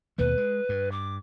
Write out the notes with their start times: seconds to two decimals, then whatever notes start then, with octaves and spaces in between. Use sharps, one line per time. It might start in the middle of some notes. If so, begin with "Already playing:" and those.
0.18 D#2 B2 A3 B4
0.38 G#3
0.69 G2
0.91 D6